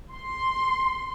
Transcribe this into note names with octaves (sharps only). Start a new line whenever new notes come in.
C6